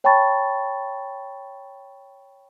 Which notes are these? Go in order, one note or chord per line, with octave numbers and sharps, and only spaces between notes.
C#5 G5 A5 B5 C#6 A6